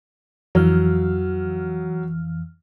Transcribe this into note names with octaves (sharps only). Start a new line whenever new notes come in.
F2 E3 F#3 F6